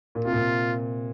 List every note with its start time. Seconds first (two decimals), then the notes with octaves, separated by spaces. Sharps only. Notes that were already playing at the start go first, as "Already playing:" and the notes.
0.15 A#2
0.25 C3 F4
0.32 A#2
0.36 C3